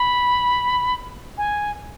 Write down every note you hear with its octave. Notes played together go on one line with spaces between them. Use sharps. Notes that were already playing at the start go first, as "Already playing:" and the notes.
Already playing: B5
G#5